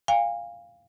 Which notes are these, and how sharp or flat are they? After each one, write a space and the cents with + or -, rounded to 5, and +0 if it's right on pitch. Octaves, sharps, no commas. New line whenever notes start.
F5 +0 G#5 -40